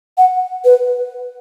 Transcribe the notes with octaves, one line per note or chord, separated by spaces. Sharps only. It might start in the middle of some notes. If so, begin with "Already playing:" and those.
F#5
B4